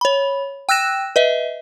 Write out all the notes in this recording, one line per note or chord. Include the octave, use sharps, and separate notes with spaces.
C#5 B5
G5 E6 F#6 A#6 E7
B4 D#5 E5